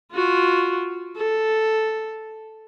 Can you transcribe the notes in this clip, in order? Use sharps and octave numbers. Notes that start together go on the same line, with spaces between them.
F4 F#4
A4